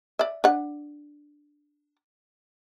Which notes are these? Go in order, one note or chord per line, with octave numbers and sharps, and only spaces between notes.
D5 E5
D4 F#5